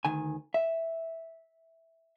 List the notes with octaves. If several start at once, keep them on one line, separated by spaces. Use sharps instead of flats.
D2 D#3 G#5
E5